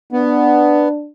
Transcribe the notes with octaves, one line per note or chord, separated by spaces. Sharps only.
B3 D4